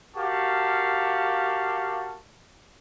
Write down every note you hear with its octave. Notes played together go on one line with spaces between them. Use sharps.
F#4 G4 A#4 F5 A5 C#6